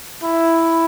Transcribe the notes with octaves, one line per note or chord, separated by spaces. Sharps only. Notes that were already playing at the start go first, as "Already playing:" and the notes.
E4